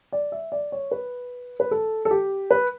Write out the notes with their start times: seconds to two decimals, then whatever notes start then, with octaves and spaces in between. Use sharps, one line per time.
0.12 D5
0.32 E5
0.52 D5
0.72 C#5
0.91 B4
1.60 B4
1.71 A4
2.05 A4
2.11 G4
2.51 B4